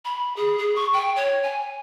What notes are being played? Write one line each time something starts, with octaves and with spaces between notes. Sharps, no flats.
B5
G#4
G#4
C#6
G5
C#5
G#5